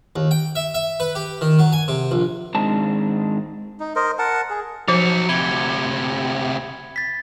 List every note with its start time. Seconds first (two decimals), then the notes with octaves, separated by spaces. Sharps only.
0.16 D#2
0.31 G5
0.55 E5
0.74 E5
1.00 B4
1.15 G4
1.41 D#3
1.59 F#3
1.73 G#5
1.88 C3
2.11 A#1
2.55 G#2 D#3 G#3 C4 D4 A5
3.80 D#4
3.96 A#4 C5 D#5
4.19 A#4 F#5 A5
4.50 G#4
4.88 F3 F#3 D#4 C5 C#7
5.29 D2 C3 B5 G#6 G7
6.96 A6 B6